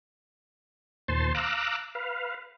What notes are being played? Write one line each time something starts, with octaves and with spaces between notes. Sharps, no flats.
D#2 A#2 C5 A5 C6
F5 A#5 D6 E6 F#6
B4 F5